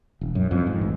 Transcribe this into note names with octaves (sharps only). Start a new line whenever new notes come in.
E1
F#2
F2
G#2
A1